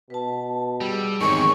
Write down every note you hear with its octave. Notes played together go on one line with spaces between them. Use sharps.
B2 B4 A5
G3 G#4 E6
E2 G#2 D#3 C4 G#4 C#5 C#6